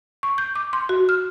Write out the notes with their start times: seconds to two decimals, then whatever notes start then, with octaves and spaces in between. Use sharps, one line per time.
0.23 C#6
0.38 G6
0.56 D6
0.73 C6
0.89 F#4
1.09 F6